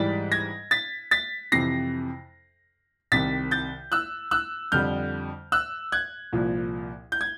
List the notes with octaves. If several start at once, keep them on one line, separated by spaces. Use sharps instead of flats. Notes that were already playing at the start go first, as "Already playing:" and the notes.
Already playing: G#2 E3 G3 A6 B6
G#6 A#6
A6 B6
A6 B6
F2 C3 E3 A#6 C7
C2 C3 D#3 A6 B6
G6 A6
E6 F#6
E6 F#6
F2 D3 G3 F6 G6
E6 F#6
F#6 G#6
C2 A#2 F3
G6
G#6